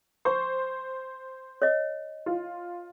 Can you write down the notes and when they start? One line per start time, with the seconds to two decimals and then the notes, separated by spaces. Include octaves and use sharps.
0.25 C5 C#6
1.62 C#5 D#5
2.26 F4